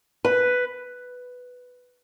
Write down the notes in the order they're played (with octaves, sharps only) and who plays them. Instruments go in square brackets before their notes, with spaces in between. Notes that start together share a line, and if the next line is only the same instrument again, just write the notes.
[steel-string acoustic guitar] B4